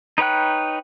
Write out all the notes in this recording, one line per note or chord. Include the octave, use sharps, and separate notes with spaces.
D#4 B4 C#5 G5 F#6